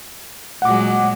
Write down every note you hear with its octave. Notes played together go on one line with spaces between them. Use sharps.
A#2 F#3 G#3 F#5 D6